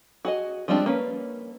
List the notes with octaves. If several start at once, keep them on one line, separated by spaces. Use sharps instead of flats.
F#4 G#4 D#5
F3 G3 G#3 C4 D4
A#3 C#4 B4